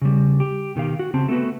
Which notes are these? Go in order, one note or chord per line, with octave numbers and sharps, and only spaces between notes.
C#3 G3
G4
B2 D#3 G4 F5
F#4
C#3 C4 A5
A3 B3 F#4 B4